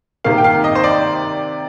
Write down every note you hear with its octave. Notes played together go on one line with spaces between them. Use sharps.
C3 D#3 A#3 F5
G5
F5
D#5
C5
D5